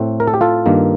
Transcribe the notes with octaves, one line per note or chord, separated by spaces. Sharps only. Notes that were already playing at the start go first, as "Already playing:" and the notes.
Already playing: A2 A3 C4
A#4
A4
G4
F4 A4
G2 D#3 A#3